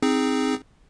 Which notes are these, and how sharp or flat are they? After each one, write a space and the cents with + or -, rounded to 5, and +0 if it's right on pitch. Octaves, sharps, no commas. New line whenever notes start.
C4 +0 D#4 +0 G#4 -5